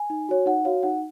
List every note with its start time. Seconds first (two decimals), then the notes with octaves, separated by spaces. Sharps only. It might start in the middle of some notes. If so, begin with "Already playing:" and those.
Already playing: G#5
0.10 D#4
0.29 F#4 C#5
0.46 D#4 F#5
0.65 F#4 C#5 F5
0.83 D#4 F#5